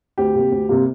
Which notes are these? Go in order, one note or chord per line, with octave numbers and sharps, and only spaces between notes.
D2 G4
C3 G3 A#3
D2
C3 G3 A#3